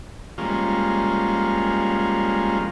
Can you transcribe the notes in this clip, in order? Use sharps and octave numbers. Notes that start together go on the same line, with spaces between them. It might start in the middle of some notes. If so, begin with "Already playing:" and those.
F3 G3 G#3 A#3 C#4 F4